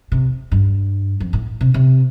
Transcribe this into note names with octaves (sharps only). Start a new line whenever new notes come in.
C3
G2
F2
A2
C3
C3